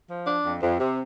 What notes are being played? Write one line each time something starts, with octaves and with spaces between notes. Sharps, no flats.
F3
D4
F2
F2
C3